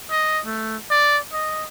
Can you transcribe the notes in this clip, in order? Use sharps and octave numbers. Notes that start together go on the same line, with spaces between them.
D#5
A3
D5
D#5